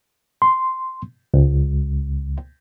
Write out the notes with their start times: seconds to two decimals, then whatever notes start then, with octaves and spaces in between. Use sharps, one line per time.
0.42 C6
1.34 C#2